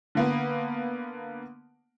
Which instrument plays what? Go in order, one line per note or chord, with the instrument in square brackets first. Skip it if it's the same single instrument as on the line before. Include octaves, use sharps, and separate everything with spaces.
[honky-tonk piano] D3 A#3 B3